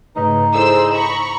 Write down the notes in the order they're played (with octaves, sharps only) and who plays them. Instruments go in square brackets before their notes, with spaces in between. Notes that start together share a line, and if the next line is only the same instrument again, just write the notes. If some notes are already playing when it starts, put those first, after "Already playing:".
[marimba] G#2 C#3 A3 [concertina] D#4 [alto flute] B4
[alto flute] E4 [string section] G#4 C5 E6 [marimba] A4 D5 D#6
[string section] A#5 B5 C#6